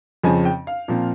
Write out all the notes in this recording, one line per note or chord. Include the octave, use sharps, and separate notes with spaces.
F2 C#3 F3 C4 G#5
G5
F5
A#2 F3 C4